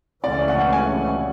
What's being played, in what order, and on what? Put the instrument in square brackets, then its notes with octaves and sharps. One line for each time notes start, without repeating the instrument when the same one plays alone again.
[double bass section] C#2 C#3 E3 A3 C#4 [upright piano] D5
[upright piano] F#5
G#5